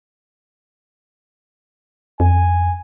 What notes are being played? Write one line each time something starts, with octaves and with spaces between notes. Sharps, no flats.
F2 G#5